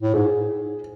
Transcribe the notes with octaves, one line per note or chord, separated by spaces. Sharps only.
A2
G#2 G#4